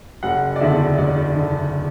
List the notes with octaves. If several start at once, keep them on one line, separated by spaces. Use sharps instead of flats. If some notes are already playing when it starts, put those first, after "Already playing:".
F#1 F#5
D5
E2 D3 E5
F#1 D5
D3